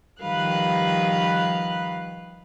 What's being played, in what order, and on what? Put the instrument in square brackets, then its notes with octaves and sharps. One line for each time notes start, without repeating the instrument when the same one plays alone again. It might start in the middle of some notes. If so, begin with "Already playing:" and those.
[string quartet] D#3 F3 G3 B4 F5 F#6